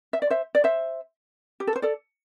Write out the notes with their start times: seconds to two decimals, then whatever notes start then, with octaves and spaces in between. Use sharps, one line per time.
0.13 E5
0.22 D5
0.30 C5 E5
0.55 D5
0.64 C5 E5
1.60 G4
1.67 A4
1.76 C5
1.82 A4 D5